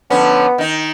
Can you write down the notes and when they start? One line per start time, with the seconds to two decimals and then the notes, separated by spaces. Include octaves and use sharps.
0.10 D3 F3 B3 C#4
0.58 D#3 D#4